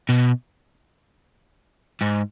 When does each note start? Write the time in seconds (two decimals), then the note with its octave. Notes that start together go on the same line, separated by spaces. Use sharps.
0.09 B2
2.01 G#2